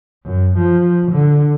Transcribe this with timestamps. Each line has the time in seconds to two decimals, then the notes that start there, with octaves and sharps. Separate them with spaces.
0.24 F#2
0.57 F3
1.11 D3